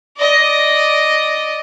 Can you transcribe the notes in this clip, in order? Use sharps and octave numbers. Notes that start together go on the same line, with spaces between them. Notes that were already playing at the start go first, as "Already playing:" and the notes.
D5 D#5